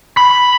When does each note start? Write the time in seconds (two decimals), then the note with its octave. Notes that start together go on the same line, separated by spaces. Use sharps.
0.17 B5